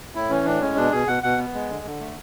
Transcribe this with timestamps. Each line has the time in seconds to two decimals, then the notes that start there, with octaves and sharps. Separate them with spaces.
0.15 A2 E4
0.30 E3 C#4
0.45 A2 D4
0.61 G#3 C#4
0.77 B2 D4
0.92 B2 G#4
1.07 B2 F#5
1.23 B2 F#5
1.38 B3
1.54 G#3
1.69 D3
1.85 D3
2.00 A3